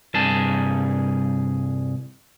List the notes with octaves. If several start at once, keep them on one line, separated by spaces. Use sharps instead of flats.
C2 G2 G#4 A5